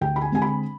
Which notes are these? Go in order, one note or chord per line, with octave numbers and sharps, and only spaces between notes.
D2 G5
B5
G#5
D3 G#3 C4 G#5
B5